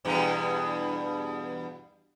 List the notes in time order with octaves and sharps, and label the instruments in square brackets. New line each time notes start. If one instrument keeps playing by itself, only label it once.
[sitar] E2 G2 B2